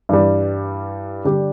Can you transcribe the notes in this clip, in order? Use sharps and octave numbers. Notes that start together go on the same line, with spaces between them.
G2 E3 G3
D3 G3 D4 G4